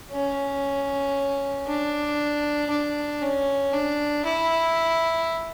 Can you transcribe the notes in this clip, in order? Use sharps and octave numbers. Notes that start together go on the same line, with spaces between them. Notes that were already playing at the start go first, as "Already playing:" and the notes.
C#4
D4
D4
C#4
D4
E4